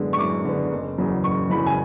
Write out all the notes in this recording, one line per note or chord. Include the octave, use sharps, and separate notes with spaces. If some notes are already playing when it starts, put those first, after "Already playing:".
Already playing: F#2 D3 G#3 B3
C#6
F#2 D6
D3 G#3 B3
F#1
E2 C#3 F#3
F#1 C#6
E2 C#3 F#3 B5
G#5